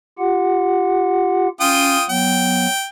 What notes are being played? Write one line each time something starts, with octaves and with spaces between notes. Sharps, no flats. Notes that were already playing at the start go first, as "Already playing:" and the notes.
F4 G4 F#5
C#4 F4 G5 D#6
F#3 B3 G5